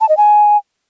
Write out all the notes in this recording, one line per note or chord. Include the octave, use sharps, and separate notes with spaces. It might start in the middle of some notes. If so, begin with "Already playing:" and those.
A5
D#5
G#5